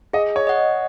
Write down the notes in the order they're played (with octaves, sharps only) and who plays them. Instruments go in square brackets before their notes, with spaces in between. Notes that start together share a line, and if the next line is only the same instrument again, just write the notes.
[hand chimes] G#4 [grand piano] D#5
[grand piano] C#5
[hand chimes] D#5 F#5